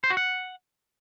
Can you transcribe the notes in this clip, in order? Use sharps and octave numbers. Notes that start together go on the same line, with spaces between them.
C5
F#4
F#5